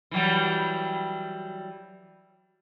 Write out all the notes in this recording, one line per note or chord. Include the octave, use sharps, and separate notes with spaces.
E3 F#3 G3